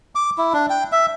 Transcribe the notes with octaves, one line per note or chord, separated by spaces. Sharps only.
D6
E4
D4
G5
E5